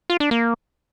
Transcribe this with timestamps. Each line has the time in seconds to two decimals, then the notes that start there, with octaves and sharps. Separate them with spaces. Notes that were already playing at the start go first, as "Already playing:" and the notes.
0.10 F4
0.20 D4
0.31 A#3